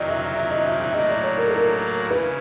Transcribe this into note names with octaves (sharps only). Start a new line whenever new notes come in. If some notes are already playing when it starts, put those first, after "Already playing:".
Already playing: F2 C3 D#3 F#3 D5 D#5
E5
E5
E5
D#5
E5
E5
A2 F#3 A#3 D#5
D5
C#5
A#4
A4
A#4
C#3 E3 B4